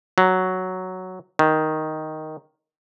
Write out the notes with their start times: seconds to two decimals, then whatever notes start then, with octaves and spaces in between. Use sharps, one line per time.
0.18 F#3
1.39 D#3